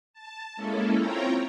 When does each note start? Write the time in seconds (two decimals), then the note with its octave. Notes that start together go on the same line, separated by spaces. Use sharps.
0.13 A5
0.56 G#3 A#3 C#4 E4 A4
0.96 C4 E4 F4 C#5 G5 A#5